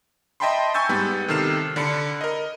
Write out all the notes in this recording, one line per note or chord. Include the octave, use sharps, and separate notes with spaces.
D#5 E5 G5 A5 B5 C6
G#5 C#6 E6 G6 A6
G#2 G3 B3
C3 D#3 A4 F6 C7 E7
D3 D4 B5 C#7
A#4 D#5